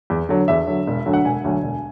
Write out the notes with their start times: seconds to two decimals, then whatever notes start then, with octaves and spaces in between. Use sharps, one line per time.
0.10 E2
0.29 D3 F#3
0.48 E2 E5
0.67 D3 F#3
0.87 E1
1.06 D2 D3 F#3
1.13 F#5
1.25 E1 G#5
1.44 D2 D3 F#3
1.63 E1